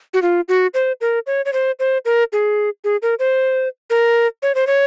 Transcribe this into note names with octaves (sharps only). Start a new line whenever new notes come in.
F#4
F4
F#4
C5
A#4
C#5
C#5
C5
C5
A#4
G#4
G#4
A#4
C5
A#4
C#5
C5
C#5